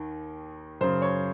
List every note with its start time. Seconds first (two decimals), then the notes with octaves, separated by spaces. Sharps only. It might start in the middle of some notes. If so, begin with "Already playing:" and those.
Already playing: D#2 D#3
0.81 F#2 C#3 C5
1.02 C#5